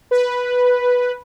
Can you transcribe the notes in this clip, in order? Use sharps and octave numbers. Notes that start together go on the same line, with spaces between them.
B4